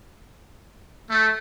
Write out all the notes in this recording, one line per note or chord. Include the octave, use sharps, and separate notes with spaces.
A3